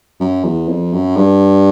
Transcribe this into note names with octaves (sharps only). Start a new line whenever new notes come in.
F#2
E2
F2
F#2
G2